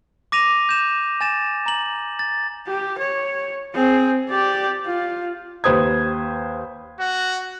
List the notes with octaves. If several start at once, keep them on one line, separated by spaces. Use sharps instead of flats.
D6 A#6 D#7 F7
G6 E7
G#5 A6 E7
A#5 F#7
A6
G4
C#5
C4 G#4
G4 D5
F4
D#2 B4 C5 D#6 G#6
F#4